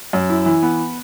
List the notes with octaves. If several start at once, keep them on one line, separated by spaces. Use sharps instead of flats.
F#2
E4
E3
B3